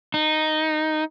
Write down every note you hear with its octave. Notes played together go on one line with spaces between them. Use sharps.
D#4